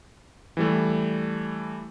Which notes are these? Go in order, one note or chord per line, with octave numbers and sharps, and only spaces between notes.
E3 G3 A3